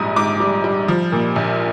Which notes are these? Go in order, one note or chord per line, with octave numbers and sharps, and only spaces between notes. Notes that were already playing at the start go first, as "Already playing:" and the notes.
Already playing: A#1 G#2 G3 D#6
G#2 D6
G3
G3
F3
A#2
A#1